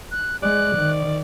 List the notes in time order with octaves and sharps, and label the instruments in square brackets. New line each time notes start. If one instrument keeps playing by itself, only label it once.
[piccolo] F#6
[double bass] G#3 [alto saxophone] D5 [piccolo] F#6
[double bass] D#3